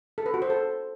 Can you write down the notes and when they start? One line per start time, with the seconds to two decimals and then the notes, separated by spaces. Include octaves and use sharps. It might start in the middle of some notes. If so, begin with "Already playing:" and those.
0.18 A4
0.26 B4
0.34 F#4
0.42 C5
0.50 A4